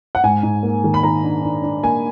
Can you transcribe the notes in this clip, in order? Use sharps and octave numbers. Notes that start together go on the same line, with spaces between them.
F#5
G#2 G#5
G#2
A#3
D#3
B5
D#3 A#5
D4
D4
D4
A#3 G#5